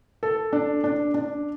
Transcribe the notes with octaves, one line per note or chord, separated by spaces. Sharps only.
A4
D4
D4
D4